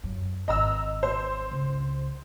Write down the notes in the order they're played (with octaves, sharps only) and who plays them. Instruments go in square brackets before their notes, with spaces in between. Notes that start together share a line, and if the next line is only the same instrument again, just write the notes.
[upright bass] F#2
[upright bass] G#1 [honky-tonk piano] D#5 A#5 E6
[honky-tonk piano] C5
[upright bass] C#2